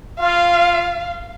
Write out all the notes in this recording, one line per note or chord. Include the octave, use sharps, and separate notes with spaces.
F4 F5